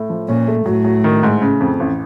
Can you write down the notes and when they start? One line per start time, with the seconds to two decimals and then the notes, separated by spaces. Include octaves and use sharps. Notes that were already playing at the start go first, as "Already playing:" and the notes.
Already playing: A2
0.10 F3
0.28 A#2 C#4
0.47 A3
0.66 A2 F#3
0.85 F#3
1.04 D#3
1.23 G#2
1.42 C#3
1.60 F2
1.80 A1